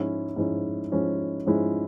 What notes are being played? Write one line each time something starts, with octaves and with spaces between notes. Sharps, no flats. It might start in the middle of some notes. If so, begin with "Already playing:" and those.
Already playing: G#2 F3 G#3 C#4 E4
G#2 F3 G#3 C#4 E4
G#2 F3 G#3 C#4 E4
G#2 F3 G#3 C#4 E4